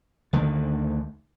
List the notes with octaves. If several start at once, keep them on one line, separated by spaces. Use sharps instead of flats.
D2 D3 D#3